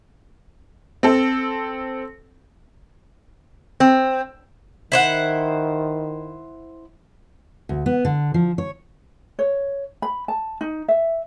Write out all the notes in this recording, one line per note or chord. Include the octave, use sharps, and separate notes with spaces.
C4 A4
C4
D#3 E4 C5 F#5
D2
B3
D3
F3
C#5
C#5
B5
A5
D#4
E5